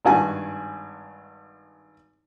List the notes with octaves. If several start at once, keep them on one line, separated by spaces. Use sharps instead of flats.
G#1 G2 F#4 G#5